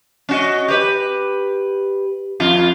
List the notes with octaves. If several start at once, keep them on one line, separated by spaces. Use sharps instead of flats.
C#4 F#4 D#5
G4 B4
F2 F4